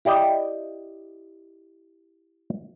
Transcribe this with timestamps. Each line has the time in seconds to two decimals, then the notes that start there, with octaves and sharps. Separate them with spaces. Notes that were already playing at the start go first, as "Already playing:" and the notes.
0.05 E4 G4 D5 D#5 G5